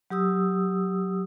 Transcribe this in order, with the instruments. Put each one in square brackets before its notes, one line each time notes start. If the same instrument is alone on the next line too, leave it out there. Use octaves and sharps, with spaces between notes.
[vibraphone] F#3 G4 D#6 E6